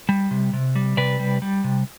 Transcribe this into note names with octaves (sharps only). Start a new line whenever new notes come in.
G3
C3
C3
G3
C3 B4 D5
G3
G3
C3